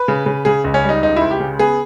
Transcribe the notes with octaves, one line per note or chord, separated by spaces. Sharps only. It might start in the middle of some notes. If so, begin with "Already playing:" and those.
Already playing: B4
C#3
C#3
C#3 G#4
C#2
C#4
G3
D#4
C#2 D#4
C#2 E4
G4
C#3
B3 G#4